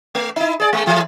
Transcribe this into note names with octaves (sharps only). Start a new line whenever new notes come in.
A3
D#4 E4
G#4 D5
G#3 A3
E3 A3